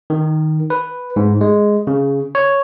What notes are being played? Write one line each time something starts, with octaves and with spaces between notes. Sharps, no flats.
D#3
B4
G#2
G#3
C#3
C#5